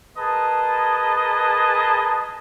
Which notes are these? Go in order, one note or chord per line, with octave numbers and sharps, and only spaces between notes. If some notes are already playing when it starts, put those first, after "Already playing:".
G#4 A#4 B4 D#5 A5